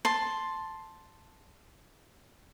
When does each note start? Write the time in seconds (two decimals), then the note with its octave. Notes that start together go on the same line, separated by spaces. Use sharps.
0.05 A5 C6